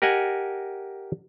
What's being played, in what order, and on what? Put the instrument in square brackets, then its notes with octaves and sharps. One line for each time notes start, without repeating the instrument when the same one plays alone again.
[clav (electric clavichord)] G4 A#4 D#5 F#5 G#5